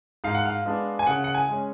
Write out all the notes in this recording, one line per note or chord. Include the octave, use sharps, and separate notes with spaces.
G#2 F5
F#5
F5
G#3 B3 D4
G#5
C#3 F#5
F#5
G#5
G#3 C#4